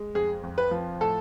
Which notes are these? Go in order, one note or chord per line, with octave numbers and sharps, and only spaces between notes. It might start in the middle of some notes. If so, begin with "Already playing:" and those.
Already playing: G#3
F2 G#4
F2
B4
F3
A2 A4